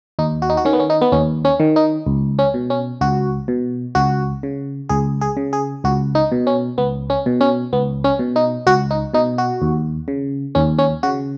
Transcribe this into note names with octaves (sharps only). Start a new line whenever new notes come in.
D#2 D#4
F#4
D#4
F#4
D#3 C#4
B3
C#4
D#4
B3
D#2 C#4
C#4
D#3
D#4
C#2
C#4
B2
C#4
C#2 F#4
B2
C#2 F#4
C#3
C#2 G#4
G#4
C#3
G#4
C#2 F#4
D#4
B2
C#4
C#2 B3
C#4
B2
C#4
C#2 B3
C#4
B2
D#4
C#2 F#4
D#4
B2 D#4
F#4
D#2
C#3
D#2 C#4
C#4
C#3 F#4